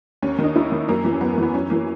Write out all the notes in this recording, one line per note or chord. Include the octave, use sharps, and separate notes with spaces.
D#2 C#4
D#3
D#4
D#2 E4
D#3
F#2 A#3
E3
C#4
F#2 B3
A#3
E3 B3
F#2 C#4
E3 A#3